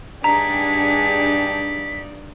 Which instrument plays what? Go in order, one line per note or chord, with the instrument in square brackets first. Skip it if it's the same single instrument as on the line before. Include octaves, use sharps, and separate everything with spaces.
[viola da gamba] G2 D#4 D5 [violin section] D4 G4 G#4 [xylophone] A#5 [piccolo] B6